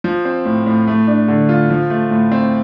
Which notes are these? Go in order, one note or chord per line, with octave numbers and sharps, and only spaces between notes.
F3
C4
A2
A2
A3
D4
D3
F4
F3
A3
A2
C4